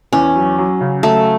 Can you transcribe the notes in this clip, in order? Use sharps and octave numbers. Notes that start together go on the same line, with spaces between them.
E2 C#4
F#3
F#3
C#3
F#3 A3